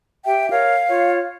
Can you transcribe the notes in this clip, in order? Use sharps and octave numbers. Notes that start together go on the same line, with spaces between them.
G4 E5 G5
A#4 C#5 F5
F4 C#5